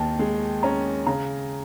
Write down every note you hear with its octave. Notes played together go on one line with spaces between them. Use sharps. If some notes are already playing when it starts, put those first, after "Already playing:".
Already playing: D#2 D#3 G5 A5
G#3
C#4 A#5
C#3 A#5